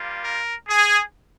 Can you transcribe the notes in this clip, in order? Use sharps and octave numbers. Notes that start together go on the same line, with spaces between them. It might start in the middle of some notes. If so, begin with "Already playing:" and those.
Already playing: G3 A#3 F4
A#4
G#4